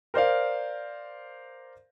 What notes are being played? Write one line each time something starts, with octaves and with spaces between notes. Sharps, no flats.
A#4 C5 D5 F5